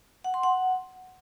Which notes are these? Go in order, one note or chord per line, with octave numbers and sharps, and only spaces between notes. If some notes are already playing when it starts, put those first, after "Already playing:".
F#5
C6
F#5